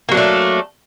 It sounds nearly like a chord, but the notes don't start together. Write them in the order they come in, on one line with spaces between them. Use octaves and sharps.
A#3 F#3 D4 A3